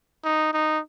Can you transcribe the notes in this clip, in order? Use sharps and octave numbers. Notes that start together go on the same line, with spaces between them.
D#4
D#4